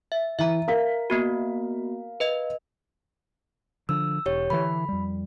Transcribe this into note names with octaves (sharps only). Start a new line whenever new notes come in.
E5
E3 E5 A#5
A#4 F5 B6
A#3 B3 F#4
B4 D#5
D3 F3 D4 E6
E1 G4 C#5
D3 E3 B5
F2 G3